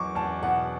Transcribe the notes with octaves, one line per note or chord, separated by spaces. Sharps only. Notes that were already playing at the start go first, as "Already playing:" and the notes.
Already playing: E2 F#3 C#6 D6
E2 A5
B2 F#5